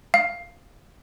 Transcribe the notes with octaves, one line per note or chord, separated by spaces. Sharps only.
F5